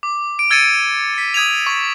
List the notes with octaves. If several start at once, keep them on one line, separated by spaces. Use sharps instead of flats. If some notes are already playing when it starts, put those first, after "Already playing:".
D6
D7
E6 G#6 A6 C#7 D#7
B6 C#7
D#6 G#6 D#7 F7
C#6